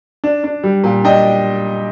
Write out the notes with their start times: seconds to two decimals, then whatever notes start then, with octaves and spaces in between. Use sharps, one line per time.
0.24 D4
0.44 D4
0.63 G3
0.84 A#2
1.04 D4 D#5 G5